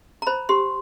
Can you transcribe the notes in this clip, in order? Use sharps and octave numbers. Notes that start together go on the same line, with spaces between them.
A#5
C5 B5
G4 C6